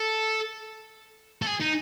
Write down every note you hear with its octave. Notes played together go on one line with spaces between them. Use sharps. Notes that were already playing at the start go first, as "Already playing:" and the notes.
Already playing: A4
A4
G#4
D#4